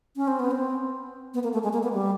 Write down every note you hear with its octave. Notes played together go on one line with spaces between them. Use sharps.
C#4
C4
B3
C4
B3
A#3
A3
G#3
A#3
B3
G3